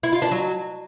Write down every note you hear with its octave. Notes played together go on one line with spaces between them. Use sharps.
E4
F4
D4
F#3